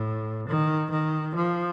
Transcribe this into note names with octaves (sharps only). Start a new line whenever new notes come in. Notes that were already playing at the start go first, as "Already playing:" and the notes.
Already playing: A2
D#3
D#3
F3